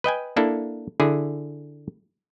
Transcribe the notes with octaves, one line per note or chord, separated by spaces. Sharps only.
B4 D#5 G5 G#5
A#3 D4 E4 A4
D3 E4 G#4